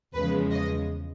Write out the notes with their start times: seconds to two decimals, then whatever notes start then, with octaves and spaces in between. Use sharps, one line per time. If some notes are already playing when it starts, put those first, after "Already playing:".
0.14 E2 C#3 F3 G#3 B4
0.51 D#5